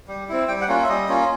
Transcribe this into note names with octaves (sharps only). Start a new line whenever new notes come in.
G3
C4 E4
G3 G5
F#5
A#3 C#4 F4
E5
G3 D#5
A#3 C#4 F4